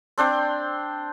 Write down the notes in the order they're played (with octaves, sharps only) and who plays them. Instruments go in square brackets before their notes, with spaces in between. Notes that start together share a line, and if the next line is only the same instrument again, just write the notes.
[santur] C4 D4 C5 G5